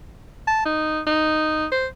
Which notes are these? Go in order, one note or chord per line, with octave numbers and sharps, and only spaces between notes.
A5
D#4
D#4
C5